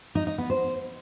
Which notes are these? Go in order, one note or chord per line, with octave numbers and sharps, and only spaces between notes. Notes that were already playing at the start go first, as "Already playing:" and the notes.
D#4
D#4
B3
C5